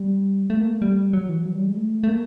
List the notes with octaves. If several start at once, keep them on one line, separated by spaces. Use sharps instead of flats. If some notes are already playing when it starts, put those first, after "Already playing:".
Already playing: G3
A3
A#3
A3
G3
F#3
E3
F#3
G3
G#3
A3
A3
A#3